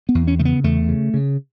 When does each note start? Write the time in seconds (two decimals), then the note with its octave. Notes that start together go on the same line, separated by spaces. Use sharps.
0.09 B3
0.15 E2
0.27 C#4
0.39 C#3 A3
0.45 B3
0.64 E2 A3
0.89 C#3
1.14 C#3